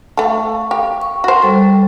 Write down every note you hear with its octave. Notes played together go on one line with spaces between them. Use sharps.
A3 A4 F5 C#6
G4
C#6
F#4 C5
G3 A4